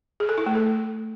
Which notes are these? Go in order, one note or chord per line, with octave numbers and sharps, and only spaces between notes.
G#4
A4
E4
A3
A4